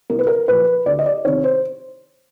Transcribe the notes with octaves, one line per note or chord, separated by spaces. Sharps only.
C2 A#4
B4
A#4
A#2 F3 B4
D2 D5
D#5
D5
C3 D#3 C#5
C5